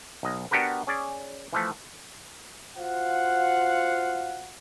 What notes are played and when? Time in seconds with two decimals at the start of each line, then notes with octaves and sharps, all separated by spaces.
0.23 B1 D#5
0.51 B3 D4 F#4 G4 A#4 B4
0.87 C#4 G#4 D5
1.53 E3 F3 A3
2.77 F4 F#4 C5 F5 F#5